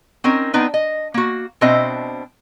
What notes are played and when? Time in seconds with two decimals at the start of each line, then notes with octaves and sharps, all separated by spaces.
0.24 C4 C#4 D#4 A#4
0.54 B3 C4 D4 D#4 B4
0.74 D#5
1.14 A#3 F#4
1.61 B2 C4 D4 C5 D#5 E5